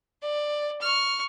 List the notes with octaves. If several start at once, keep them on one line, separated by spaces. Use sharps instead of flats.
D5
C#6 F6